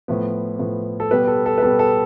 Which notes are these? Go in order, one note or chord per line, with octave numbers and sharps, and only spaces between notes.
A2 F3 B3
A2 F3 B3
A4
B2 G3 B3 B4
A4
A4
B4
B2 G3 B3 A4
A4